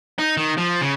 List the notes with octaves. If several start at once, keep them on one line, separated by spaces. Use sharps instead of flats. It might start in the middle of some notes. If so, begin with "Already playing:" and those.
D#4
D#3
F3
C#3